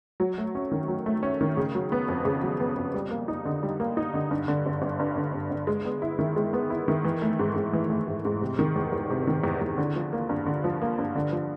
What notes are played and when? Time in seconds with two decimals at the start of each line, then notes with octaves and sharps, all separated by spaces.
0.20 F#3
0.38 A3
0.55 C#4
0.72 D#3
0.88 F#3
1.06 A3
1.23 C#4
1.41 D#3
1.57 C#3
1.75 F#3
1.92 B3
2.08 F2
2.25 C#3
2.43 F#3
2.60 B3
2.77 F2
2.94 G3
3.11 A#3
3.28 D#4
3.45 D3
3.63 G3
3.80 A#3
3.97 D#4
4.14 D3
4.31 G2
4.48 D3
4.66 G1
4.82 G1
4.99 G2
5.16 D3
5.33 G1
5.51 G1
5.67 G#3
5.85 B3
6.02 E4
6.19 D#3
6.36 G#3
6.53 B3
6.70 E4
6.88 D#3
7.04 E3
7.22 A3
7.39 G#2
7.56 G#2
7.73 E3
7.90 A3
8.08 G#2
8.25 G#2
8.41 C3
8.59 D#3
8.76 E2
8.92 E2
9.10 C3
9.27 D#3
9.44 E2
9.61 E2
9.78 D3
9.96 F3
10.13 A#3
10.29 G2
10.46 D3
10.64 F3
10.82 A#3
10.98 G2
11.16 D3
11.32 F3